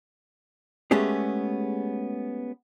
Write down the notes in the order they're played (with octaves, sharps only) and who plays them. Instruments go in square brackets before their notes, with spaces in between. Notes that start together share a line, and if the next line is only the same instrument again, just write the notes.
[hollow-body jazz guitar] G#3 A3 B3 C#4 G4 G#4